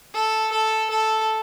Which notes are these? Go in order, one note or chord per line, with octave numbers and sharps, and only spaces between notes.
A4
A4
A4